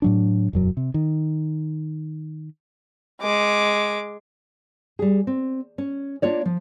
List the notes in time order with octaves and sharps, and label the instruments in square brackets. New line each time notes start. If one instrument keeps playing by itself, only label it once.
[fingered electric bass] A2 F#3 D4
E1 F#2 F#3
C3
D#3
[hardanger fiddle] G#3 D6
[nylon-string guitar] G3 G#4
C4
C#4
A#3 D4 F4 C#5 D5
F3